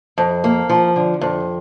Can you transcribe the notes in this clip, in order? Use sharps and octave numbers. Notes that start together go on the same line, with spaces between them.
F2
A#3
F3
D3
F2